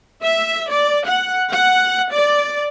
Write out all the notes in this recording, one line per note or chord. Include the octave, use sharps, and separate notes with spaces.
E5
D5
F#5
F#5
D5